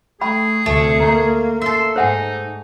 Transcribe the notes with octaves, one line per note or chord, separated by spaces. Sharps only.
A3 G#4 G5 B5
D2 C3 A3
A#3 A#5
A4 E5 C6
G#2 D#4 C5 F#5 G#5